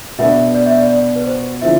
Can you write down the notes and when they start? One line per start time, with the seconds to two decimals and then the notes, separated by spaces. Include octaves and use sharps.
0.18 B2 B3 D4 E5
0.54 D5
0.66 E5
0.77 D5
0.90 D5
1.16 B4
1.26 C5
1.62 D3 F3 C4 E4 E5